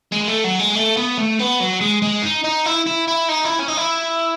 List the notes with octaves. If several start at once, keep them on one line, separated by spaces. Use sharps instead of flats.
G#3
A3
F#3
G#3
A3
B3
A3
B3
F#3
G#3
G#3
D#4
D#4
E4
E4
E4
D#4
E4
C#4
D#4
E4